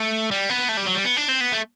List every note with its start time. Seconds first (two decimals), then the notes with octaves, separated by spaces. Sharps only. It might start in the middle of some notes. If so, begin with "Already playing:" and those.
Already playing: A3
0.31 G3
0.50 B3
0.69 A3
0.77 G3
0.86 F#3
0.95 G3
1.04 B3
1.17 D4
1.29 C4
1.41 B3
1.53 A3